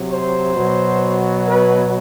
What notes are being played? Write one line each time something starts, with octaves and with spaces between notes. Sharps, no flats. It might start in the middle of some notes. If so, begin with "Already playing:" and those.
Already playing: C3 F#3
C5
B2 F#3
B4